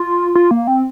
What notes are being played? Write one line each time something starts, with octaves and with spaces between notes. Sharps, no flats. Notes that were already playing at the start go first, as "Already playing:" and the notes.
Already playing: F4
F4
A#3
C4